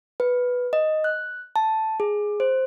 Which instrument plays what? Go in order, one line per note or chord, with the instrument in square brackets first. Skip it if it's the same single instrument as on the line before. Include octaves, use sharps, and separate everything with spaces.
[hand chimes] B4
D#5
F#6
A5
G#4
C5